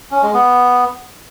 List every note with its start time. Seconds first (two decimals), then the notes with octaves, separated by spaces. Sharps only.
0.11 C#4
0.23 G#3
0.34 B3